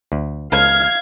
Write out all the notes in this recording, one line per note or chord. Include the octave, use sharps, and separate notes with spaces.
D2
C#2 A4 B4 F5 F6 G#6